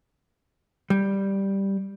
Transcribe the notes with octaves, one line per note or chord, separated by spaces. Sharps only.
G3